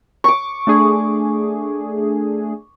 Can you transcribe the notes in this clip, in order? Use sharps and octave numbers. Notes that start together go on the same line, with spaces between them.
C#6 D6
A3 D4 G#4